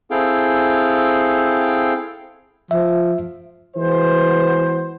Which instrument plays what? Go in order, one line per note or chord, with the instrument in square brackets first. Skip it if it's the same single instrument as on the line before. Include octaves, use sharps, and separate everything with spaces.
[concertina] C4 E4 G#4 A4 F5 G5
[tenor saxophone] F3 [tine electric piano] E5
[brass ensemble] E3 G#3 B3 F#4 C5